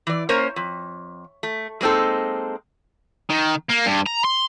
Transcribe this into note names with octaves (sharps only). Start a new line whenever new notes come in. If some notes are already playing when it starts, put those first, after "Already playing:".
E3 D5
A#3 C#4 A#4 C5 C#5
F2
A3
G#3 A#3 C4 D#4 A4
D#3
A#3
G2
A#5
C6